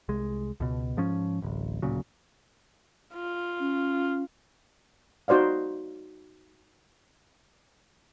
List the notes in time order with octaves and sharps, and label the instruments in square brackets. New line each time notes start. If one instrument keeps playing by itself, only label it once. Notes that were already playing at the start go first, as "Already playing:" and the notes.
[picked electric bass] C2 G#3
C#2 B2
G#2 F3 C#4
D1 A1
D1 A#2 C#3 F#3
[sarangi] F4
[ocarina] C#4
[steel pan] D#4 F#4 C5 D5 F5